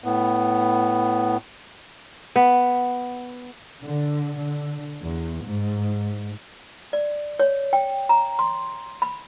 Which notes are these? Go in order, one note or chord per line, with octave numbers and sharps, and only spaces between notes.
A2 B3
B3
D3
D3
E2
G#2
D5
C#5
G5
A#5
C6
B5